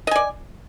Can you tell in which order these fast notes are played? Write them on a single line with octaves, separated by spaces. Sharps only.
D#5 G#5 D5